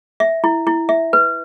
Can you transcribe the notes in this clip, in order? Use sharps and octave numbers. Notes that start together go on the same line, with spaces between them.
E5
E4
E4
E5
B4